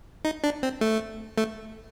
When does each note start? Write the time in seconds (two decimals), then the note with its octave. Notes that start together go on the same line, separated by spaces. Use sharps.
0.25 D#4
0.44 D4
0.63 C4
0.81 A3
1.38 A3